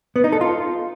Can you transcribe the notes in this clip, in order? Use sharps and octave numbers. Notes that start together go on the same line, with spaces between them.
B3
D#4
A4
F4